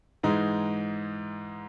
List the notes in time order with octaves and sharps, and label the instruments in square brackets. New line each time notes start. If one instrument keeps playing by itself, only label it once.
[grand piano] G#2 E3 G#3 D#4